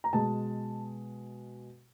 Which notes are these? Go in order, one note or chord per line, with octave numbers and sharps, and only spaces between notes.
A#5
B2 G#3 A5